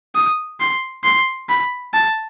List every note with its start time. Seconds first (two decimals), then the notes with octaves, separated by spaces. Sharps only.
0.15 D#6
0.60 C6
1.04 C6
1.49 B5
1.94 A5